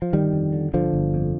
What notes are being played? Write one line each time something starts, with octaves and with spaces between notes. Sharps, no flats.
F3
G1 D#3 G3
F2
D3
G1 D3 F3
G1
F2